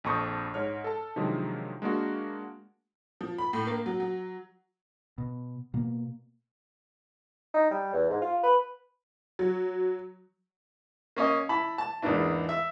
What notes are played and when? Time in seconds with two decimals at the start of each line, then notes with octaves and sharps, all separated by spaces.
0.04 A#1 F2 A5 C#6 D#6 G6
0.54 G#2 C#5 F6
0.84 A4 A5
1.16 C3 D#3 F3 F#3 G#3 D4
1.82 G#3 A#3 D4 F#4
3.21 F3
3.38 B5
3.53 A2
3.67 A#3
3.86 F#3
4.00 F#3
5.18 B2
5.74 B2 A#3
7.54 D#4
7.71 G3
7.93 E2
8.10 G#2
8.22 F4
8.43 B4
9.39 F#3
11.16 A#3 C#4 C#5 D#5
11.49 E4 A5 B5
11.78 A5
12.02 E2 G#2 A#3 B3 D4 E4
12.49 E5